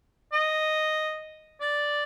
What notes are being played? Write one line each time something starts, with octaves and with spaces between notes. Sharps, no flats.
D#5
D5